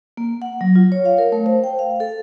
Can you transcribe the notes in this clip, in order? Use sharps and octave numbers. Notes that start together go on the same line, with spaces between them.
A#3
F#5
F#3
F4
C#5
F5
A#4
A3
C5
G5
F5
A4